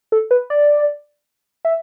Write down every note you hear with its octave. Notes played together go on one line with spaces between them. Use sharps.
A4
B4
D5
E5